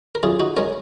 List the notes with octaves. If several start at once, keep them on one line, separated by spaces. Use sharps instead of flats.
A#4
F#2 F4 G#4
D#4 F#4
C#3 G#3 C#4 A#4 C#5